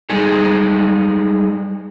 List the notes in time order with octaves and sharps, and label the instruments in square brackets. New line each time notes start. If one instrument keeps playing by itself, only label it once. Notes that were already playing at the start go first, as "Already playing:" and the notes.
[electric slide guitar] G3 G#3 D#4 G#4 A4